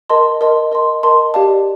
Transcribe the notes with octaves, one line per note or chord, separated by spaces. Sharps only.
A#4 D#5 A5 C6
A#4 D#5 A5 C6
A#4 D#5 A5 C6
A#4 D#5 A5 C6
G4 D5 F5 A5